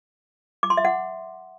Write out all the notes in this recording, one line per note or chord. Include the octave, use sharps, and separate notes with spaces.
D6
C6
E5
F#5